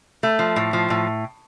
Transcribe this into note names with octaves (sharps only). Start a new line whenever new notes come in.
A3
F3
A2
F3
A2